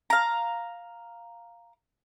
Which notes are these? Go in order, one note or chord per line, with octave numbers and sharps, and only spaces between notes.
F5 A#5